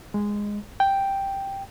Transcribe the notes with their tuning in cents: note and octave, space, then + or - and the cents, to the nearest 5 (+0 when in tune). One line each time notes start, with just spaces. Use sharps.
G#3 -10
G5 +0